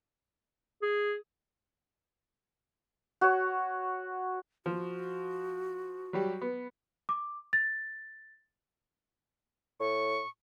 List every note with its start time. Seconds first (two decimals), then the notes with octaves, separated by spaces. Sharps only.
0.82 G#4
3.21 F#4 C#5
4.66 F3 F#4
6.13 F#3 G3 G4
6.41 B3
7.09 D6
7.53 A6
9.80 A2 C#6